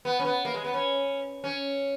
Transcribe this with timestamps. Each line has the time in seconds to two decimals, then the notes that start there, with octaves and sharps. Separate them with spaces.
0.05 B3
0.20 C#4
0.25 B3
0.45 A#3
0.54 G#3
0.65 B3
0.74 C#4
1.44 C#4